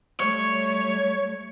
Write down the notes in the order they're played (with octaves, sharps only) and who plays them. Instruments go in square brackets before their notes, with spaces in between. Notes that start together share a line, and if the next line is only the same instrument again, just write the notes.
[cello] G3 A3 [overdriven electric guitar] C#5